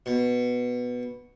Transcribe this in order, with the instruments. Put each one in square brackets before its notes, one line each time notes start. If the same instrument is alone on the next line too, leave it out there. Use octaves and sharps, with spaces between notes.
[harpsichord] B2